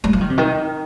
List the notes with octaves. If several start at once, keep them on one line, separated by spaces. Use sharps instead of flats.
G#3
F3
D#3
C3
D#3